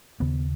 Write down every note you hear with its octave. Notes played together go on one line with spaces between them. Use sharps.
D#2 C#3 B3